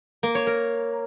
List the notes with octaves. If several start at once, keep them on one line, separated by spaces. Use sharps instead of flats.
A#3
C#5
A#4